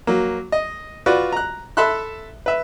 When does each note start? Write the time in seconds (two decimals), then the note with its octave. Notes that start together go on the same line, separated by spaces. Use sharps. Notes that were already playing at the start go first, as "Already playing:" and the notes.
0.07 F#3 A#3
0.52 D#5
1.06 F4 F#4 B4 D5
1.32 A#5 F#6
1.77 A4 E5 B5 C6 F#6
2.46 B4 E5